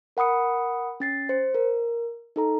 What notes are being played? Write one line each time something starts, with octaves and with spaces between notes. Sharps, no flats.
A#4 F#5 B5 D#6 C#7
C#4 A6 C7
C5 C#7
A#4
D#4 A4 A#5